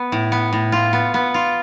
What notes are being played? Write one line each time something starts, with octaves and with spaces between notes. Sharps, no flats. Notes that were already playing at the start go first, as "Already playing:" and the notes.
Already playing: B3
A2
B3
A2
F4
B3
B3
F4